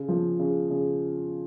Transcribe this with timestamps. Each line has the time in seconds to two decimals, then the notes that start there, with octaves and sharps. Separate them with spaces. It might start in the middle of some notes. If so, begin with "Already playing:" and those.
Already playing: C#3
0.08 F3
0.40 C#3
0.70 C#3